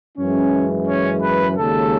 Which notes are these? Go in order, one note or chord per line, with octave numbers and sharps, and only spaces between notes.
F#2 E3 G#3 C#4
C#4
B4
D#2 C#3 G#3 A4